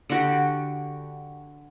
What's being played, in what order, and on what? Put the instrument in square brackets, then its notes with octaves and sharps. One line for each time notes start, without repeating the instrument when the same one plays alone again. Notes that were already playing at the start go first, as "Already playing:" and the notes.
[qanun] D3 F#4 G4